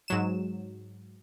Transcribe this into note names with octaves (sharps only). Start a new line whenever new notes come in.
G#2 F#3 E7